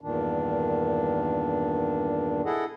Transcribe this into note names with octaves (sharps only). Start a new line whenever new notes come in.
E2 G2 A#2 D#3 D4
E4 G#4 A4 D#5 F#5